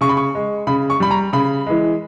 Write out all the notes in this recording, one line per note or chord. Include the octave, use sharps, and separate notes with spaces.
C#3 C#6
B5
C#6
G#3
C#3 B5
C#6
G3 B5
A#5
C#3 B5
E3 G#3